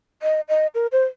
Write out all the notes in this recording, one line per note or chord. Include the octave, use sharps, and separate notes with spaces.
D#5
D#5
A#4
C5